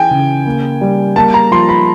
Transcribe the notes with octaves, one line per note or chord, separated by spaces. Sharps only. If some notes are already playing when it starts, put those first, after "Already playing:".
Already playing: E3 G5 G#5
C#3
A#3
G3
A#3 A5
A#5
F3 C6
B5